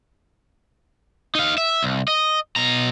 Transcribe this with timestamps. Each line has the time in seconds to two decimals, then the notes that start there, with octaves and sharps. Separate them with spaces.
1.35 D#4 F5
1.58 E5
1.83 C2
2.08 D#5
2.56 B2 A#5